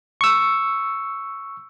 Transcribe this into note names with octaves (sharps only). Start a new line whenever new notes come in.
C#6 E6